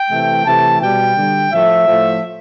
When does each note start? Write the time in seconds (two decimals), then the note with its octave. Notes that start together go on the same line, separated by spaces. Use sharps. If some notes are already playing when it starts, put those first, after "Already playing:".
Already playing: G5
0.11 C3 E3 A3
0.45 C3 E3 A3 A5
0.81 B2 G3 G5
1.17 D3 G3
1.52 A2 F3 A3 E5
1.87 A2 F3 A3